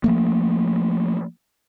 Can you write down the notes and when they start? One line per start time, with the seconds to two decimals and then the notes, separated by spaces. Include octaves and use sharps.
0.04 F3 A3 A#3